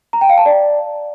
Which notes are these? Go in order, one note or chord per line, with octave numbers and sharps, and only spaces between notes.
A#5
G5
F5
A5
D5